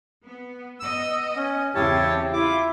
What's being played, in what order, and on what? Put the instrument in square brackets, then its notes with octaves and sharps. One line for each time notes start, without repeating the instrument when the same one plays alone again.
[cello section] B3
[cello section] B3 D#5 [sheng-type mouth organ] E6
[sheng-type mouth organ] C#4
[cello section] E2 C#3 C4 [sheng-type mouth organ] E4 C#5 A5 [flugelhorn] G4
[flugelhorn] E4 [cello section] F4 [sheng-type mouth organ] D6